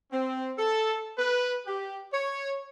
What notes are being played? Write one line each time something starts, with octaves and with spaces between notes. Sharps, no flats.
C4
A4
B4
G4
C#5